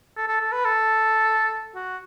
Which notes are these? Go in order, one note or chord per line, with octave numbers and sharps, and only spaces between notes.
A4
A4
A4
B4
A4
F#4